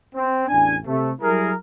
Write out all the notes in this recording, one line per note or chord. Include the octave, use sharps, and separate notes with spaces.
C4
A1 E2 D4 G#5
C3 A3
F#3 G3 E4 G#4 A#4